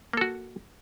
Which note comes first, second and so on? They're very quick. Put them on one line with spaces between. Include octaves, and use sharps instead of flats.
A#3 A4 F#4